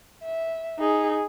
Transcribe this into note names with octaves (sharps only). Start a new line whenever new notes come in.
E5
D#4 G#4